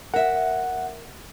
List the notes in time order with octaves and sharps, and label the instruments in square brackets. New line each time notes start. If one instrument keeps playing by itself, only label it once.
[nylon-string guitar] A#4 E5 [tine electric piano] F#5